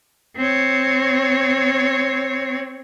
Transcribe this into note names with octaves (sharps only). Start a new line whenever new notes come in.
C4 C#5